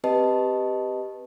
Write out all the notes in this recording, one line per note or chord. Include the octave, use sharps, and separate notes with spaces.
C4 G4 B4 D#5 A5